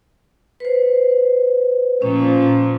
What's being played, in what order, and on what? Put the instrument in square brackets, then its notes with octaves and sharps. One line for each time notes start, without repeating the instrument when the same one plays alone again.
[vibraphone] B4 C5
[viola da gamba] A#2 F3 [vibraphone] C#4